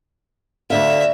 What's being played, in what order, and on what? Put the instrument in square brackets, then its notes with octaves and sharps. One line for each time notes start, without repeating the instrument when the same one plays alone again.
[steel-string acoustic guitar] D2 D3 F5 [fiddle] E5